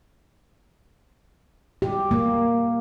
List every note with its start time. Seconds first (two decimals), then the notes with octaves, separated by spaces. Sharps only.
1.82 G4
2.11 A#3